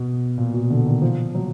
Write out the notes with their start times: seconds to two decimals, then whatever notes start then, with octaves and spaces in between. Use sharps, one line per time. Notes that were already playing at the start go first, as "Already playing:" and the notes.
Already playing: B2
0.38 A#2
0.54 B2
0.70 D3
0.86 D#3
1.02 F3
1.35 F#3